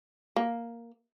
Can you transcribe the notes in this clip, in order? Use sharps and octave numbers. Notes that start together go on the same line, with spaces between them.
A#3